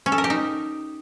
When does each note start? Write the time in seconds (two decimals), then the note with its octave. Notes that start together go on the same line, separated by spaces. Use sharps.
0.06 C#4
0.12 A4
0.18 A#4
0.24 G4
0.30 D#4